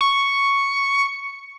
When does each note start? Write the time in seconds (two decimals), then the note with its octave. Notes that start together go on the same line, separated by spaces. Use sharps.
0.01 C#6